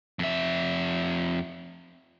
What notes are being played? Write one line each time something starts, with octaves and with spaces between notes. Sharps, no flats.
F2 E5